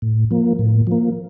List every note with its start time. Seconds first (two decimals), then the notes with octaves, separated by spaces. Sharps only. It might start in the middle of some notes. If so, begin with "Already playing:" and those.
0.02 A2
0.31 F3 A#3
0.59 A2
0.87 F3 A#3